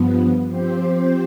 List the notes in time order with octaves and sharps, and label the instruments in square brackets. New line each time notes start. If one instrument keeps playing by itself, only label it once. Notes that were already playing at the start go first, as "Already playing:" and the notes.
Already playing: [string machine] G2 F3 B3
F3 C4 G4 C5